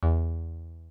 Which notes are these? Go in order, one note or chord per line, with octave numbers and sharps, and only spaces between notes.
E2